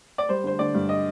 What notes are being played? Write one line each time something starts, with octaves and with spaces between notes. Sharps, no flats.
D5
G3 C5
D3 C5
D3 D5
G2
D#5